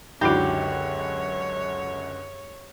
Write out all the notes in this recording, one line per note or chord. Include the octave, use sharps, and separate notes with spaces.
C#2 F#2 D3 D#4 E4 F#4 G4 C#5